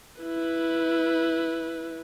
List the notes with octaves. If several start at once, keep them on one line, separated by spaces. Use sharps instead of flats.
E4 B4